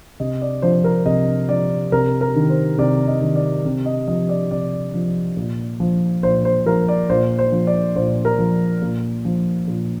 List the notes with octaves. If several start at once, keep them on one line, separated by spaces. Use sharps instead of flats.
C3 D#5
D5
F3 C5
A#4
C3 D#5
F3 D5
C3 A#4
A#4
D#3
C5
C3 D5
D#5
D#3
D5
C3
D#5
F3 D#5
D5
C3 D5
F3
A#2
F3
A#2 C5
C5
F3 A#4
D5
A#2 C5
C5
F3
D5
A#2 C5
A#4
F3
A#2
F3
A#2